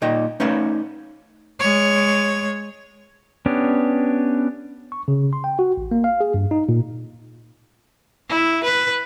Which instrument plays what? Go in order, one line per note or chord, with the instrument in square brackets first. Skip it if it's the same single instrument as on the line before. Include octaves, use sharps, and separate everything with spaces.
[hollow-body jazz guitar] A#2 D#4 D#5 G5
A3 C#4 D#4 B4 C#5 F5
[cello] G#3 C#5
[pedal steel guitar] B3 C#4 D4 G4
[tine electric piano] C#6
C#3
C6
G5
F#4
A1
A#3
F5
G#4
G2
D#4
A#2
[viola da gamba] E4
B4